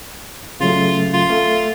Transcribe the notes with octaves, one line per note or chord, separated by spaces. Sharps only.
C#3 F#3 A3 F4
F4
A3 F5